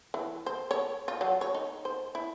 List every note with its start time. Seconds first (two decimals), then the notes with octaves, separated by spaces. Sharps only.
0.14 E3
0.46 C5
0.71 C#5
1.08 F4
1.21 F#3
1.41 C#5
1.54 D#4
1.85 C5
2.15 E4